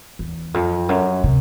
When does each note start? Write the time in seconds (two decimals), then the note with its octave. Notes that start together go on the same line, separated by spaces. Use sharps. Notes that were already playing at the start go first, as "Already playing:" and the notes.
0.19 E2
0.54 F2
0.89 F#2
1.24 C3